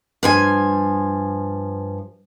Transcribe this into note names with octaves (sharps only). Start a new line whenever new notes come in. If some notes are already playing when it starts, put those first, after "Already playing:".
G2 F3 G#5